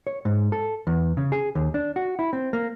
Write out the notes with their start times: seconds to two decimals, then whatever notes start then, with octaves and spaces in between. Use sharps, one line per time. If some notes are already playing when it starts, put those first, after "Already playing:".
0.07 C#5
0.25 G#2
0.52 A4
0.87 E2
1.17 C#3
1.32 G#4
1.55 D#2
1.74 D4
1.96 F#4
2.19 E4
2.33 C4
2.53 A#3